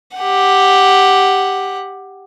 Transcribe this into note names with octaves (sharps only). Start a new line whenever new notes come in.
G4 F#5